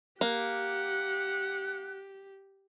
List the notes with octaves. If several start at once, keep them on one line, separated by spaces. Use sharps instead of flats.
A#3 G4 F#5